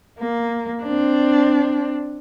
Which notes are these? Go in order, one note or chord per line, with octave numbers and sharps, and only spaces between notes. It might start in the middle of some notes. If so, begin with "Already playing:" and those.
A#3
C4 D4